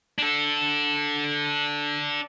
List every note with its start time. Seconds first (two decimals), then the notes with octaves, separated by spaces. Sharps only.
0.18 D4 A4